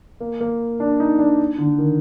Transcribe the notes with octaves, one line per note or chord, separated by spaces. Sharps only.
A#3
A#3
D4
D#4
D4
D3
D#3